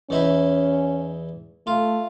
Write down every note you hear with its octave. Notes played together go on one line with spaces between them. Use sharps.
E2 C#4 D#4 E4
A3 F4